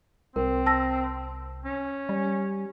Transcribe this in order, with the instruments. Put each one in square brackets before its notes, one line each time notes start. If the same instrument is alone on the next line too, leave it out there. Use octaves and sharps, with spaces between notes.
[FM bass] C2 [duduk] C4 [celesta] A#4
[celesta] A5 E6 A#6
[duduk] C#4
[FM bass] G3